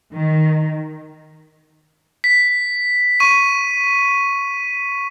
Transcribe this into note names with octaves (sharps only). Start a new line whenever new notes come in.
D#3
B6
C#6 D#7